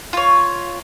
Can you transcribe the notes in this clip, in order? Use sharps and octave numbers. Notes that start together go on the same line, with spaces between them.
F4 C#5